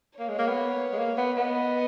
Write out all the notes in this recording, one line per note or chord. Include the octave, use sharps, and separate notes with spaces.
A#3 C#5
G#3
A#3
B3
G#3
A#3
B3
B3 D#5